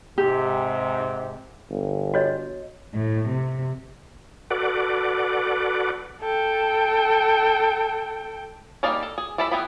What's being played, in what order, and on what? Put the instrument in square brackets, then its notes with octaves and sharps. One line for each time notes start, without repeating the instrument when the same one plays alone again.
[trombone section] G#2 C3 [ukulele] G4
[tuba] G1
[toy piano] F#4 C#5 D#5
[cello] A2
C3
[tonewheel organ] F#4 A4 B4 D5 F#5 D6
[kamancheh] A4 G5
[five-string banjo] G3 A#3 D#4 D5 F5
A4
G#4
G3 E4 A4 E5 B5
E3 B3 G#4 G5 B5